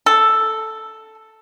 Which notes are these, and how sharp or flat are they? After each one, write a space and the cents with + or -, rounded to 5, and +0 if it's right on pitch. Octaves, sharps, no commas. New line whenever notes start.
A4 +0